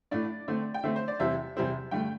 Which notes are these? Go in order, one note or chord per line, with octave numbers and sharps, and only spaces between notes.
A2 A3 D4 D5
D3 A3 C4
G5
D3 A3 C4 E5
C5
D5
E2 C3 G3 C4 E4 E5
E2 C3 G3 C4 E4
G2 D3 A3 G5